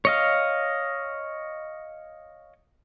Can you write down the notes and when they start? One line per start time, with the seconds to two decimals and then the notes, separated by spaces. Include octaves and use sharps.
0.05 C#5 D#5 F5